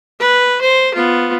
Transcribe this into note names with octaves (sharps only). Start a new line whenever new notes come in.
B4
C5
B3 F4